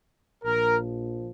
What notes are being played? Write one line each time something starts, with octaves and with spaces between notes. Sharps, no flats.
A#1 A#2 F3 A#4